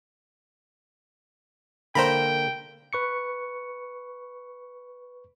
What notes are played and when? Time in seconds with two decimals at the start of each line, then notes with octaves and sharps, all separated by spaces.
1.95 D3 A#3 C5 G5 A#5 B5
2.93 B4 C#6 C#7